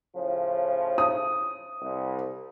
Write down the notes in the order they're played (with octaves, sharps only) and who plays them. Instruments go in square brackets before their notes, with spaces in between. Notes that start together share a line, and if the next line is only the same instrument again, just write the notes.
[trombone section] A2 C#3 F3
[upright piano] D#6
[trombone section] C2